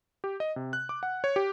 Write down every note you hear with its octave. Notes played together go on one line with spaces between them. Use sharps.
G4
D#5
C3
F#6
D6
F#5
C#5
G4